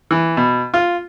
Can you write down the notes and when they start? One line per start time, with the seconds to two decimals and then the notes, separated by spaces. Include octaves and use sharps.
0.11 E3
0.37 B2
0.74 F4